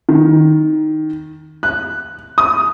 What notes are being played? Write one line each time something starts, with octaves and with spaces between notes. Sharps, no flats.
D#3
F#6
D#6